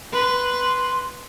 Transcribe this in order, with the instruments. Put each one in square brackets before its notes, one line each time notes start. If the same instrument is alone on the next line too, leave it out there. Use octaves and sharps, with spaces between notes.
[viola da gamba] B4 [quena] C6